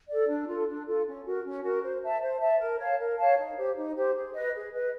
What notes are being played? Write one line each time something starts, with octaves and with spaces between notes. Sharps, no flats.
A4 D5
D4
F4 A4
D4
F4 A4
C#4
F#4 A#4
C#4
F#4 A#4
C5
E5 A5
C5
E5 A5
A#4
C#5 F5 A5
A#4
C#5 F5 A5
D#4
G4 C5
D#4
G4 C5
G#4
B4 D#5
G#4
B4 D#5